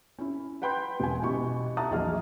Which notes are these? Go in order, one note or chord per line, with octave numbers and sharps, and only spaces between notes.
C#4 E4
B4 F#5 G5 B5 C6 G6
E1 G#5
B2 C#4 E4 F#4 G4 C#6
E5 F#5 A5 A#5 D#6
A#1 E2 F#3 G#4 D#5 F6